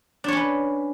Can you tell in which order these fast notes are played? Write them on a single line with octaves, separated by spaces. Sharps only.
D4 C#5 C#4 B4